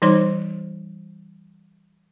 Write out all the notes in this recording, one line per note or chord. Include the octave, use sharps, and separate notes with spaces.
E3 G3 D#4 C5 C#5 C6